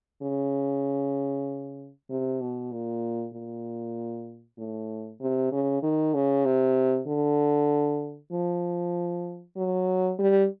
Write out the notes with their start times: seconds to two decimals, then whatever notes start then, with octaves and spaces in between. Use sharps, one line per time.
0.23 C#3
2.10 C3
2.41 B2
2.72 A#2
3.34 A#2
4.58 A2
5.20 C3
5.52 C#3
5.83 D#3
6.14 C#3
6.45 C3
7.08 D3
8.32 F3
9.57 F#3
10.19 G3